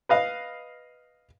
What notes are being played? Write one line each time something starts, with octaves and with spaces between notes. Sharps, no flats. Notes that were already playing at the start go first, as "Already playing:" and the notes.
B4 D#5 F5